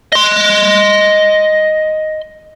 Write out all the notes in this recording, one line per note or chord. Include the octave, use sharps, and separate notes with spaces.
D#5 C6